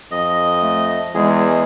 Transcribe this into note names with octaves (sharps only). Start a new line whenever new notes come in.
F2 D#5
A3
E2 G#3 G#4